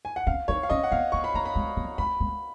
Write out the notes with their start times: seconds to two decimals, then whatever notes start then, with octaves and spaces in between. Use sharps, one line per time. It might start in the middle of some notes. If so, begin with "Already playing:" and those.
0.05 G#5
0.16 F#5
0.27 C#4 F5
0.48 D#4 C#5
0.63 F5
0.70 C#4 D#5
0.83 F#5
0.92 B3 F5
1.12 B3 C#6
1.24 B5
1.34 A#3 A#5
1.45 B5
1.55 G#3
1.77 F#3
1.98 G#3 B5
2.20 G#3